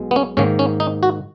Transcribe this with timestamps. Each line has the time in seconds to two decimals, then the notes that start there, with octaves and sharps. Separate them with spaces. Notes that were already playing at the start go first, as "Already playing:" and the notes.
Already playing: B1 B2 G#3
0.11 B3
0.16 C#4
0.37 G#2 D#3 A#3 C#4
0.59 C#4
0.80 D#4
1.03 F#4